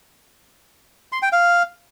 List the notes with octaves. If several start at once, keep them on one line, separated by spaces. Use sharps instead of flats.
C6
G5
F5